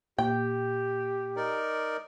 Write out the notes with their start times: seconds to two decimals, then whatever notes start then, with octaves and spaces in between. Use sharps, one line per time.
0.18 A#2 G4 G5
1.36 D#4 A#4 D5